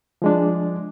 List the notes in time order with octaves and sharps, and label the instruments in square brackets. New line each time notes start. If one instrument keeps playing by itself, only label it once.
[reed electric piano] F3 G#3 D4